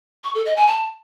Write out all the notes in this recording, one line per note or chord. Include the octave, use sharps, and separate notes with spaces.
C#6
A4
D#5
G#5
A5